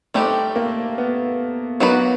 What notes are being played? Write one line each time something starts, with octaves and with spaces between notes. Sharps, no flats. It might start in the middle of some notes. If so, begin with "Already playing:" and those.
G3 A3 C4 D#4 G4 B4
A#3
B3
F#3 A#3 B3 D#4 F#4 B4